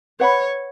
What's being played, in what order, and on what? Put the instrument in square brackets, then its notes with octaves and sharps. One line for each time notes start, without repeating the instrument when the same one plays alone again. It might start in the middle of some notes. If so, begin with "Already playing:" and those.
[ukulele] B4 F#5 B5 [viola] C#5